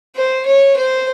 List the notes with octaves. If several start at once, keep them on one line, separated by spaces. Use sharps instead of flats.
C5
C#5
C5